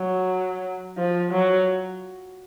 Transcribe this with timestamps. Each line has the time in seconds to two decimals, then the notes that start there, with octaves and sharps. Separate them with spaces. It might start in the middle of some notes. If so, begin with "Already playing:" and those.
Already playing: F#3
0.97 F3
1.32 F#3